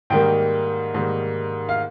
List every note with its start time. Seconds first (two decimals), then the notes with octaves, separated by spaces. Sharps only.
0.10 G#2 D#3 G3 A#3 G5
0.94 G#2 D#3 G3 A#3
1.69 F5